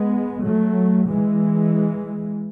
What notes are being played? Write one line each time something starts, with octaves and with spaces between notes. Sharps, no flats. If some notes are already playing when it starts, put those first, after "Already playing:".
Already playing: G#3 B3
F#3 A3
E3 G#3